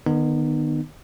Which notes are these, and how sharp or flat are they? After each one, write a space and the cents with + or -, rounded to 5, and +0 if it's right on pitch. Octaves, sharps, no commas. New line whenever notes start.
D#3 -35 B3 +0 D#4 -30